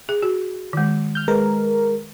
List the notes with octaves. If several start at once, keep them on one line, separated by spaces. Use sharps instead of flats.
G#4
F#4
D#3 G#3
F6 G6
G#3 A#4 B4